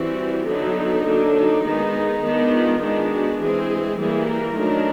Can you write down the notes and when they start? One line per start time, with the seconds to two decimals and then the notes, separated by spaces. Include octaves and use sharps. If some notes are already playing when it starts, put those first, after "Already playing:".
Already playing: E3 G3 C4 F#4
0.48 D3 F#3 B3 D4 D#4
1.06 D3 F#3 A#3 D4
1.36 D#4
1.65 D#3 G#3 B3
2.23 D#3 G#3 B3 D4
2.53 F4
2.82 D#3 G#3 B3 D4
3.11 F#4
3.40 E3 G#3 C4 G#4
3.99 E3 G3 A#3 G#4
4.28 A#4
4.58 D#3 F#3 A3 D4